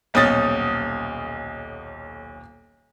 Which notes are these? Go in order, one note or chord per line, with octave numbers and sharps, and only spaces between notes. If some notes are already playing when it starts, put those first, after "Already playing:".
D#1 B1 C#4 D#6 A6